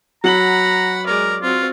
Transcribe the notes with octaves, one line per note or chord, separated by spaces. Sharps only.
F#3 F#5 A#5 B5 F#7
G#3 A#4 D5
C4 F4 F#4